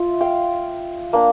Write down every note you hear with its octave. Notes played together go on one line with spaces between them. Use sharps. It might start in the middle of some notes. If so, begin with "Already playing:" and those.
Already playing: F4 E5
F5 G5
A#3 D4